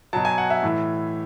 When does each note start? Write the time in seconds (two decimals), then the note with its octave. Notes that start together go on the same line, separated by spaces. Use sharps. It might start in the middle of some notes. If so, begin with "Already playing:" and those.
0.13 B2 F#3 A5
0.25 G#5
0.38 F#5
0.50 E5
0.63 A2 E3